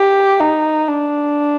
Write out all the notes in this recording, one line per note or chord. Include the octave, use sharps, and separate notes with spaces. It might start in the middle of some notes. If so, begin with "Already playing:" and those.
Already playing: G4
D#4
D4